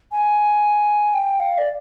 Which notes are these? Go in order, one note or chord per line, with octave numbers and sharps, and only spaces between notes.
G#5
G5
F5
D5